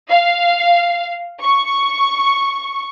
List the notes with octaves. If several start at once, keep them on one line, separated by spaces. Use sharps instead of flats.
F5
C#6